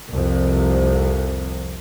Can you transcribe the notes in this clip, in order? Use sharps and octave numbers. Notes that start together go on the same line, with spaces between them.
C2 F2 C3